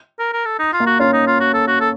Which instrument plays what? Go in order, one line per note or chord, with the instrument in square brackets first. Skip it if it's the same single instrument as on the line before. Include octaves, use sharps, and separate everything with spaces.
[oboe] A#4
A#4
A4
D#4
F4
[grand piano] A#3
[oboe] F#4
[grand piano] C#4 [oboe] F4
[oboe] D#4
F4
F#4
A4
F#4
A4